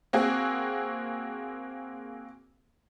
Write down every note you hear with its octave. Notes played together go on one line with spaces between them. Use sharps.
A#3 C4 F#4 G#4